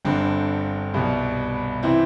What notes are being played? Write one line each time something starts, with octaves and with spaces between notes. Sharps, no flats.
G1 G2 D3 C4
C2 B2 G3
C3 E3 C4 E4